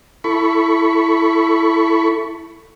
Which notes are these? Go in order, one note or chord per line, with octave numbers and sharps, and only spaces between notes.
E4 A4 B5 C#6